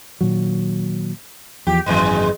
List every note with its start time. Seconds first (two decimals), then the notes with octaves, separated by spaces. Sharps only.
0.21 A#2 D#3 F#3
1.67 E2 F3 G4
1.86 G#1 F#2 A#2 E3 G#3